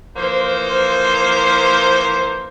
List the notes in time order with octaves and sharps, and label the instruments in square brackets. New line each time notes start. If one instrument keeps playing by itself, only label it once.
[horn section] E3 F3 A#3 C5